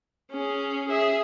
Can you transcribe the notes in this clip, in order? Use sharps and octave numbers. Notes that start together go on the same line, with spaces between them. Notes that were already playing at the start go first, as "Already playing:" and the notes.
C#4 G#4
G#4 E5